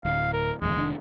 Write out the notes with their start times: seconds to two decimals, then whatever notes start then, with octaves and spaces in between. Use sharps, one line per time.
0.05 D1 F5
0.33 A#4
0.62 D1 E2 G#3
0.76 F1 D#3 D4